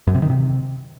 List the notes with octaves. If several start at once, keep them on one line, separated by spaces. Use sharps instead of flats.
F#2
C3
D#3
C3